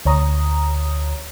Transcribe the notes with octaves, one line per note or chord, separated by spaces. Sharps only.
D2 C#5 A#5 D#6